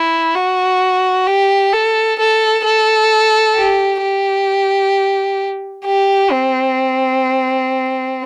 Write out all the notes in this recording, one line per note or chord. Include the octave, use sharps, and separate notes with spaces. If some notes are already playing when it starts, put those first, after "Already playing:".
Already playing: E4
F#4
G4
A4
A4
A4
G4
G4
G4
C4